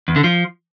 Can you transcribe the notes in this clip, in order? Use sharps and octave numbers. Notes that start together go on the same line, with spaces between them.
E2
D3
F3